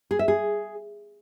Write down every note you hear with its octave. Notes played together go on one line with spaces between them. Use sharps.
G#4
E5
G#4